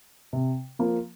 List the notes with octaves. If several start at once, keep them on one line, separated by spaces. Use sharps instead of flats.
C3
F3 A#3